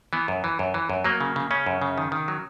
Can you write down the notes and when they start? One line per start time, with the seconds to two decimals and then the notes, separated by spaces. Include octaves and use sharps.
0.13 E3 B3
0.28 F#2
0.44 E3
0.59 F#2
0.74 E3
0.89 F#2
1.04 F#3 A#3
1.21 C#3
1.36 C#3
1.51 C#3 C#4
1.66 F#2
1.82 C#3
1.98 D#3
2.12 D#3
2.28 F#3